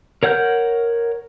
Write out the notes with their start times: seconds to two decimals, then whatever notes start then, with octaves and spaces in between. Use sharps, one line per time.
0.23 A#4 C#5 F#5 F6 G6